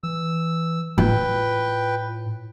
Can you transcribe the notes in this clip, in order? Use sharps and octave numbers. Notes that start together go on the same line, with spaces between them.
E3 E6
A2 F4 B4 G5